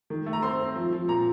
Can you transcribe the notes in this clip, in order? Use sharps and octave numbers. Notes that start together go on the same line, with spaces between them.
D#3
A3
A#5
C4 C6
C4
F3
F3
A#2 A#5